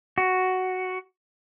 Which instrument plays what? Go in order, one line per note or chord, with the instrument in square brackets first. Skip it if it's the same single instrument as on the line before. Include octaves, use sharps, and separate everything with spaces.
[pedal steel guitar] F#4